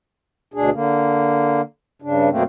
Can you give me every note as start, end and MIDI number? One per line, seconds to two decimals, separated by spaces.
0.54 0.70 38
0.54 0.70 47
0.54 0.70 62
0.54 0.70 68
0.72 1.61 50
0.72 1.61 58
2.02 2.29 43
2.02 2.29 49
2.02 2.29 62
2.30 2.43 42
2.30 2.43 47
2.30 2.43 57
2.30 2.43 58
2.30 2.43 60